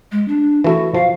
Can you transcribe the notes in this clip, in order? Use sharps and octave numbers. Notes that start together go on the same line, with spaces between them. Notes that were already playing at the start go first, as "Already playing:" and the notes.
G#3
D4
E3 A3 E4 F#4
F3 F5